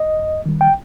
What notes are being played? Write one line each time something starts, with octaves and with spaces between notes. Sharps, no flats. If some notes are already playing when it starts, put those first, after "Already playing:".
Already playing: D#5
F2
D#3 G3
G5